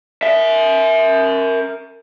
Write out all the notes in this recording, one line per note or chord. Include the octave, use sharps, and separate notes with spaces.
A#4 E5